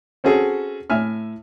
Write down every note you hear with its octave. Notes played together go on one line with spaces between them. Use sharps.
C4 C#4 F#4 G#4 A4
A2 E5 G#5 F6